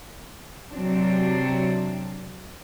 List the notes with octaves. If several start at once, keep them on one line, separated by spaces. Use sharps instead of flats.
C3 F#3 C4 D4